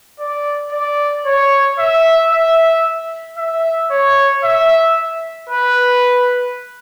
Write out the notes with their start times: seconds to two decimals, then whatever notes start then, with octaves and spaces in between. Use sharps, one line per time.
0.20 D5
0.73 D5
1.26 C#5
1.79 E5
2.32 E5
3.38 E5
3.91 C#5
4.44 E5
5.49 B4